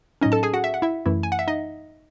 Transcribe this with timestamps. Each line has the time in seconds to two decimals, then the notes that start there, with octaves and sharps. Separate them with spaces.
0.21 A2 F#3 C#4 D#4 D#5
0.32 A4 A5
0.43 G#4 G#5
0.54 F#4 F#5
0.64 E5
0.74 F#5
0.82 E4 E5
1.06 F#2 E3 A3 E4
1.23 G#5
1.32 F#5
1.39 E5
1.47 D#4 D#5